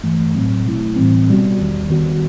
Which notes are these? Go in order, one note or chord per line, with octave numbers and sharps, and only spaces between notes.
G2 E3 A3
A2 F#3 C4
B2 A3 E4
A2 E3 G3 C4
B2 G3 B3 F#4
E2 D#3 G3
D#3 G3 B3 F#4